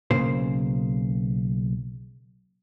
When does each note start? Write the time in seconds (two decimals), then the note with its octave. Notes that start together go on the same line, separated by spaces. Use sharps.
0.11 B1 C#3 A#3 C5